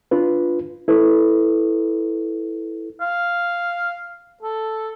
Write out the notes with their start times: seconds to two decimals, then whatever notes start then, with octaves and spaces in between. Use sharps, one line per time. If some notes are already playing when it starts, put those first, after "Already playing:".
0.11 D4 F4 B4
0.88 E4 A4 B4
3.01 F5
4.43 A4